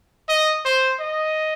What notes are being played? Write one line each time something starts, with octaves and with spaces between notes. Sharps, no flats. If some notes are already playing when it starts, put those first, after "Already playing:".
D#5
C5
D#5